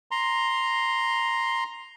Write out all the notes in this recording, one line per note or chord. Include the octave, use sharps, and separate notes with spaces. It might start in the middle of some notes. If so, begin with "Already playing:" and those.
A#5 C6